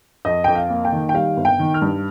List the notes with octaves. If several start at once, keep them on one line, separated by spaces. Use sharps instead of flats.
F2 D#5
F2 G5
F5
A#3
G5
D#3
G5
G3 F5
G1
G5
D#3
F6
G2